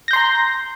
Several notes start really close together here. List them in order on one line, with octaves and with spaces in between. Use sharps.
A#6 G6 C6 A#5